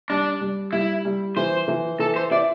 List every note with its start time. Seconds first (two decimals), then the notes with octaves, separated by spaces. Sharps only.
0.10 G3 D4
0.41 G3
0.73 G3 E4
1.05 G3
1.36 E3 C5
1.68 E3
1.99 E3 A4
2.16 C5
2.31 E4 D5